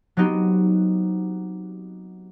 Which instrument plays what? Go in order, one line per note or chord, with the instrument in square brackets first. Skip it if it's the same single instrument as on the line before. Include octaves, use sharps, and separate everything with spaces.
[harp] F#3 B3 C4 D#4 G4